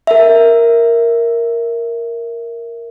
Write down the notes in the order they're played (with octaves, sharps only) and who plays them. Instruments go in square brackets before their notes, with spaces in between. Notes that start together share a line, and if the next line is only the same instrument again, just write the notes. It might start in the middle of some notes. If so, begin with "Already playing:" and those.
[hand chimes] A#4 E5